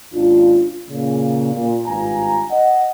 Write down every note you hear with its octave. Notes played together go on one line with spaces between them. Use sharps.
G#1 D#2 C#4 D4 F4
A#2 C#3
A#2
G#1 G2 F4 G#5 A#5
D#5 F#5